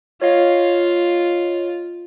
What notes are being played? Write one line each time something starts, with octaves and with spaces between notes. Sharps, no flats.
F4 C#5 D#5 F5